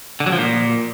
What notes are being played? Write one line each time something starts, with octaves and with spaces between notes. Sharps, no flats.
D3
F#3
F3
A#2